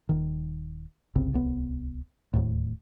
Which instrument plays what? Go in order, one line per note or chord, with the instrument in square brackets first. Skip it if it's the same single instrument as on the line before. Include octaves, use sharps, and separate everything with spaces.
[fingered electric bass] D#1 D#3
G1 C2 C#3 C4
D1 C2 B3
D1 D#2 A2